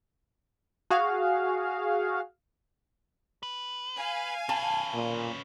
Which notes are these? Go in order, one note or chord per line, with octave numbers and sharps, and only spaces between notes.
F#4 G#4 F5
B4
F5 G#5
C#4 B4 A5
A#2